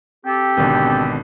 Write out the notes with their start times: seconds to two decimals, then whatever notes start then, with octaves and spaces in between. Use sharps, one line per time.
0.25 C4 G4 A4
0.57 G#1 B2 D3